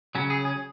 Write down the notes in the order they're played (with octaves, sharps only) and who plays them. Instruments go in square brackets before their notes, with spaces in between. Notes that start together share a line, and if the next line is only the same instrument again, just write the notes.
[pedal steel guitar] C#3 F#3 C#4
G#4
G#4